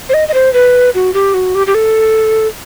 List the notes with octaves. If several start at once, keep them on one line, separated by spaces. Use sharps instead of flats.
C5
D#5
D#5
C5
B4
F#4
G4
F#4
G4
G4
A4